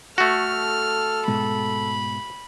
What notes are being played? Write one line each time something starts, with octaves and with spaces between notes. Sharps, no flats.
A3 F#4 A4 F6
G#2 B2 G#3 B5